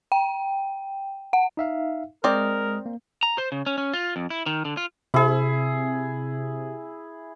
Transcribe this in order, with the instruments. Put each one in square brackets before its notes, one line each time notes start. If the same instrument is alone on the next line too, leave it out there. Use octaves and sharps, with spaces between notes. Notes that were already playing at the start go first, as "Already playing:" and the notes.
[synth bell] G5
F#5
[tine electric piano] D#4 E5 F5
[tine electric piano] G#3 D#6 [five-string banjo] C4 D5 [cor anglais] A#4
[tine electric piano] A#3
[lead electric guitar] A#5
C5
C#3
C#4
C#4
F4
F2
E4
D#3
D3
F4
[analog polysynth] C3 [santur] E4 G#4